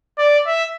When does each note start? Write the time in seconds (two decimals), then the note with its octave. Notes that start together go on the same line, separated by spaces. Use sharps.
0.18 D5
0.46 E5